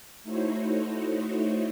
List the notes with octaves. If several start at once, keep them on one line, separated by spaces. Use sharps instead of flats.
A3 D#4 E4 F#4 C5 C#5